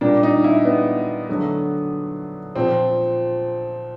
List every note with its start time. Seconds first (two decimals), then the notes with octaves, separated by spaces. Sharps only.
0.01 A#2 G3 A#3 D4
0.23 D#4
0.44 E4
0.65 B3
1.29 D3 F#3 A3
2.56 A#2 F3 C4